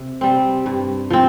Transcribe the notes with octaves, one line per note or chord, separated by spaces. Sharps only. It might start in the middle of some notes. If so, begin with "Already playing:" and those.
Already playing: C3
G3 C4
G2
F3 C4